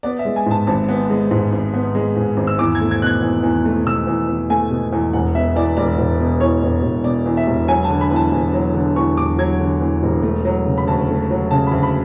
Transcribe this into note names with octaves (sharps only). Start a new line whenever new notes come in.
B3 D5
E5
G#3
G#5
G#2 A5
G#1 A5
B3
G#3
G#2
G#1
B3
G#3
G#2
G#1
E6
E2 D6
G#6
A3
G#6
B2 F#6 G#6
E2
E2
A3
B2 E6
E2
E2
A3 G#5
B2
E2
E1 F#5
B2 E5
E2 D5
E1 D5
E1
B2
E2 C#5
E1
E1
B2 D5
E2
E5
E1
F#3 G#5
A5
D3
B5
E2 A5
E1
F#3
D3
E2 C#6
E1 D6
F#3 G#6
D3
E2
E1
A3
F#3
C#3
B5
D2 A5
A3
F#3
C#3 A5
D2 B5
B5